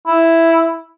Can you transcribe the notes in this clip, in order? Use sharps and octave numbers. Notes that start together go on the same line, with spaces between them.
E4